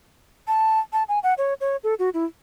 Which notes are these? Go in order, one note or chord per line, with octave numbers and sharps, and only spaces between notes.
A5
A5
G#5
F#5
C#5
C#5
A4
F#4
E4